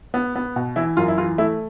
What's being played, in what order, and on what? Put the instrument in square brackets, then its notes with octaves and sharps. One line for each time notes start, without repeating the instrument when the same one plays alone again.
[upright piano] B3
B3
B2
E3 E4
F#2 F4
E4
E3 F4
A3 E4